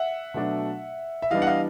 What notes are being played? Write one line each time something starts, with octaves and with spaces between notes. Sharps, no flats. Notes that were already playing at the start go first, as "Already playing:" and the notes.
Already playing: E5 F#5
B2 F#3 A3 D4
E5
E3 G3 B3 D4 D#5 F5
F#5
D#5 F5